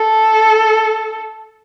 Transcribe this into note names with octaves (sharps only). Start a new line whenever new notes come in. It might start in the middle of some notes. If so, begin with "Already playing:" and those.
Already playing: A4